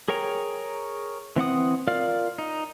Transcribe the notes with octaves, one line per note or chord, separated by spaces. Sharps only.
G#4 A#4 C#5 G5 A#5
E3 C4 F#5 D#6
F4 A#4 D5 F5 F6
D#4